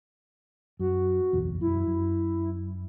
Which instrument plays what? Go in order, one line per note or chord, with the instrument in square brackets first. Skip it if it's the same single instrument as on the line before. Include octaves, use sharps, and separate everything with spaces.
[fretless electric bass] F#2 [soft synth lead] F#4
[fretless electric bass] F#1 B1 E2
[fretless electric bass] F#2 [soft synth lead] E4
[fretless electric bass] F#2